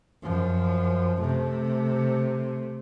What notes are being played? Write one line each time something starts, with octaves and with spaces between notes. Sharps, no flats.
F#2 F3
C3 A3